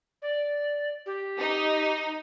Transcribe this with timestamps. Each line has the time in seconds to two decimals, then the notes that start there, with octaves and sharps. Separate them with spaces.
0.22 D5
1.06 G4
1.39 D#4